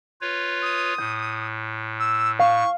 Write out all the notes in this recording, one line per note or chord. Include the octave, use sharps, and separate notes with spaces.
F4 B4 C#5
D#6
A2 G6
E6
F5 C#6 E7